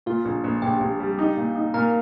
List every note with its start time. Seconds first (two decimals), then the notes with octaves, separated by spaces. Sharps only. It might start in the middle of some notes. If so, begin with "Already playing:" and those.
0.06 A#2 F4
0.25 A#1
0.44 A#1
0.62 A#1 G4
0.80 A#1
1.00 G3
1.19 D#4
1.37 A#2
1.55 D#4
1.74 A#2 A#4